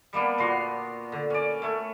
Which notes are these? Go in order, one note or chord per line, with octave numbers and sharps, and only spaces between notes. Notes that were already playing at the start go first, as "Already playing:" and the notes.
G3 A#3 B3 D4
A#2 B3 F#4 C6
D3
C#4 D5
A3 C#5